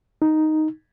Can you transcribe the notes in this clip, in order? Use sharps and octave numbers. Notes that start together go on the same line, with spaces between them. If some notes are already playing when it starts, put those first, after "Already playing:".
D#4